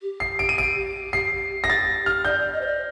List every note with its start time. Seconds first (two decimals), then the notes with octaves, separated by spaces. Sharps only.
0.02 G4
0.20 C7
0.39 D7
0.49 D#7
0.58 D7
1.13 C7
1.64 A#6
1.70 A6
2.06 F6
2.25 D5 G6
2.38 D5
2.53 D#5
2.61 C5
2.67 D5